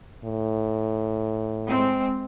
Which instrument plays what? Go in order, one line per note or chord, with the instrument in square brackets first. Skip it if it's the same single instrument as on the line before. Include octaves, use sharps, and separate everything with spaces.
[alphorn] A2
[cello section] G#3 C4